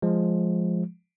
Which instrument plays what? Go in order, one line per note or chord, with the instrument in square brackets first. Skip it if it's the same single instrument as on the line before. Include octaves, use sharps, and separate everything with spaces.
[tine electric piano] F3 G#3